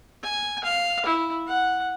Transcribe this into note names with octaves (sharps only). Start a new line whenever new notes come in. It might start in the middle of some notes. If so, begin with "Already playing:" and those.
G#5
F5
E4
F#5